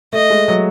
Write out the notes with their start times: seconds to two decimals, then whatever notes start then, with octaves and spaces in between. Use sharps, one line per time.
0.13 A3 D#5
0.30 G#3
0.48 F#3